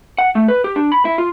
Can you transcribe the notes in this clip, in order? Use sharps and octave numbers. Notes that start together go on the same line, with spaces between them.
F#5
A3
B4
G4
D4
B5
E4
F4